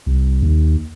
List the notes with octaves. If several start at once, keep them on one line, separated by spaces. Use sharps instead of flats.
C2
D#2